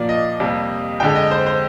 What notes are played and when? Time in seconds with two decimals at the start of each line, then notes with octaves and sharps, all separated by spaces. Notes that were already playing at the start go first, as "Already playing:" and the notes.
Already playing: A#2 F3 A#3 D5
0.09 D#5
0.40 F2 C3 G3 A#3
1.00 F2 D3 G#3 G5
1.15 D#5
1.31 C5
1.46 C5